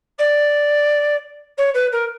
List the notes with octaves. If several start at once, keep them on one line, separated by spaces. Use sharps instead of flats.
D5
C#5
B4
A#4